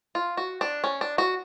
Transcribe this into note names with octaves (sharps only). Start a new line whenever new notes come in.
F4
F#4
D4
C#4
D4
F#4